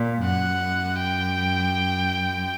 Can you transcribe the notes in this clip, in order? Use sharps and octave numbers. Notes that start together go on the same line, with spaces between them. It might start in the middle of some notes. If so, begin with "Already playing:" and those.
Already playing: A#2
F#2 F#5
G5